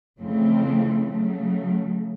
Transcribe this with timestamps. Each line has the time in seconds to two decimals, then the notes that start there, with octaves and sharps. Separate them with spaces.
0.19 F2 C#3 E3 A3 C4
1.09 C#3 F#3 A3